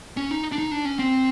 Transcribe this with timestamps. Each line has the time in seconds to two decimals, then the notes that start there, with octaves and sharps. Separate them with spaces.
0.17 C#4
0.31 D#4
0.52 D4
0.58 D#4
0.71 D4
0.85 C#4
0.99 C4